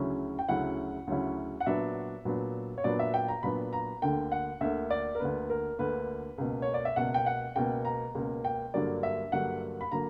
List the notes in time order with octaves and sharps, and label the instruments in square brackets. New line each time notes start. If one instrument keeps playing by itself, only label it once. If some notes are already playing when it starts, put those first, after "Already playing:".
Already playing: [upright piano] D2 C#3 F#3 C#4 E4
G5
D2 C#3 F#3 C#4 E4 F#5
D2 C#3 F#3 C#4 E4
F#5
A#2 F#3 B3 D4 E5
A#2 F#3 B3 D4
C#5
A#2 F#3 B3 D4 D5
E5
G5
A#5
A#2 F#3 B3 D4 B5
A#5
D2 D3 A#3 G5
F#5
D2 D3 A#3 E5
D5
A#4
D2 D3 A#3 B4
A#4
D2 D3 A#3 B4
C#2 B2 A#3
C#5
D5
E5
C#2 B2 A#3 F#5
G5
F#5
C#2 B2 A#3 G5
A#5
C#2 B2 A#3
G5
G2 D3 F#3 A#3 D5
E5
G2 D3 F#3 A#3 F#5
B5
D3 F#3 A#3 A#5